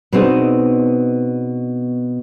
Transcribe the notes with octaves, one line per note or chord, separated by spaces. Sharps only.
B2 B3 C4 D4 D#4 G#4